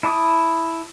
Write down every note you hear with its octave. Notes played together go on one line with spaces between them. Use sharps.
E4 A5 D6 D#6